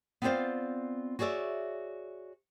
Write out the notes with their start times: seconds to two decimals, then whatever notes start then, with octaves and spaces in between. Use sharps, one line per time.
0.22 B3 C4 F4 C5 D5 F5
1.19 F#4 G#4 C#5 D5 E5